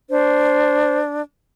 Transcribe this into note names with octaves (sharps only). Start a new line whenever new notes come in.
D4 C5